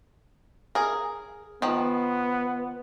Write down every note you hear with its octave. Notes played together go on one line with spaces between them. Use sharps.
G#4 A#4
D#3 F3 B3